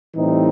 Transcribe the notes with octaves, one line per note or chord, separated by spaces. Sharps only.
A2 E3 G3 C4 D#4